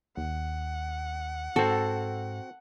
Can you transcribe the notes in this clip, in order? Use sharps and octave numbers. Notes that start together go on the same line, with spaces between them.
D#2 F#5
G#2 C4 F#4 A4